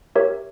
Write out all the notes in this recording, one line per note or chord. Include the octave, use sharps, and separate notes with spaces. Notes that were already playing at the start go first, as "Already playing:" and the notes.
G4 A#4 C#5 E5